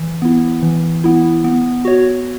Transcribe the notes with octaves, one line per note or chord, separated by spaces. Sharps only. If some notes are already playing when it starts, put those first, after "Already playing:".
Already playing: E3
B3 E4
E3
B3 E4
B3
F#4 C#5